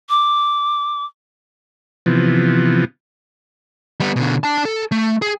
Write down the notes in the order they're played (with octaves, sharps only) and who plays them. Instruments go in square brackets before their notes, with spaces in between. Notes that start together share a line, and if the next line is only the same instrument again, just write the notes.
[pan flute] D6
[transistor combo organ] C3 E3 F3 B3
[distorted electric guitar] G3 B3
B2 D3
D4 A5
A4
A3
G#4